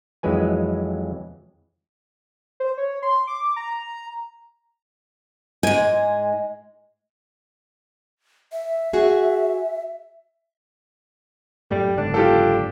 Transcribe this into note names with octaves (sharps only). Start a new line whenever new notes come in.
F2 E3 F#3 G#3 B4 G#5
C5
C#5
C6
D6
A#5
G#2 G#3 G#5
E5
F#4 G#4
F#2 A2 G3 A3
F#1 G#2 D3 D4
F4 G4 A4